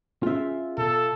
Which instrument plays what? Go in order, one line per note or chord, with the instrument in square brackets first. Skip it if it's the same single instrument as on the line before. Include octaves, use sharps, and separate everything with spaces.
[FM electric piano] C#4 G#4 [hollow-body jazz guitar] F4 E5
[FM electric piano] B2 [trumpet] A4